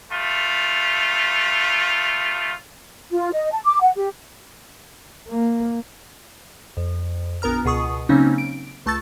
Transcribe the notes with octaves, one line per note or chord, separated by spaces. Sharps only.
G3 A3 F4
F4
D#5
A5
D6
F#5
G4
A#3
F2
A#1 B3 A#4 A#5 F6
C#2 B2 G#4 C#6 D#6
C#3 F#3 A#3 C4 C#4 D#4
D7
C#2 A3 A5 C#6 E6 A6